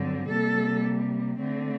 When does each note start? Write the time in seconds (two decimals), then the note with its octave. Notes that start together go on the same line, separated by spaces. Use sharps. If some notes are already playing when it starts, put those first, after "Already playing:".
Already playing: G2 D3 F#3 C4
0.29 C3 G3 A#3 A4
1.38 D3 A3 C4